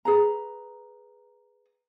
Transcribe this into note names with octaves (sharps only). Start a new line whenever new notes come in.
G#4 B4 A#5